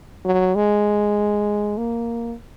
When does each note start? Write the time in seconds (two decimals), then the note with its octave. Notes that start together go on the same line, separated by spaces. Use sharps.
0.25 F#3
0.55 G#3
1.78 A#3